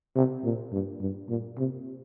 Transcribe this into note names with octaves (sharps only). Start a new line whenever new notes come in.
C3
A#2
G2
G2
A#2
C3